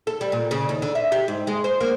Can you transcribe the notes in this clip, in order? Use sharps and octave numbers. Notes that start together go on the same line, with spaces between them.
A4
G3
A#2
C#3
D#2
D3
E5
G4
G#2
G#3
C5
A#3